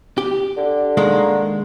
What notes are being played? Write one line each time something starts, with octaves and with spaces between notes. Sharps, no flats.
G4
D3
D#3 G#3 A#3